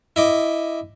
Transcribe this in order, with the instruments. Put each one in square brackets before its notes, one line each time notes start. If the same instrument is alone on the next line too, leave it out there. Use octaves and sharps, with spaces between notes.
[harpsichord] E4 D#5 D6